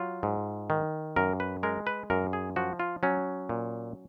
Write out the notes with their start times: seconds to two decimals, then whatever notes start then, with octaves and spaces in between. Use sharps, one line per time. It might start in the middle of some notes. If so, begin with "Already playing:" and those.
Already playing: F#3 F4
0.23 G#2
0.70 D#3
1.16 F#2 A#4
1.40 B4
1.63 G#3 A#4
1.87 B4
2.10 F#2 A#4
2.33 G#4
2.56 F3 F#4
2.80 F4
3.03 F#3 C#4
3.49 A#2